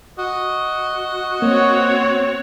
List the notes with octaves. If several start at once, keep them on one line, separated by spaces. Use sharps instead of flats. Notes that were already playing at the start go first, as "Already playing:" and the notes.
F#4 D#5
A#3 C4 C#5 F#5